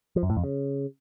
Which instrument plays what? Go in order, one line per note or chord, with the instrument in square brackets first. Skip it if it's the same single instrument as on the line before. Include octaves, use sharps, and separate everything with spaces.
[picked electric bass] F3
F#2
A2
F2
C#3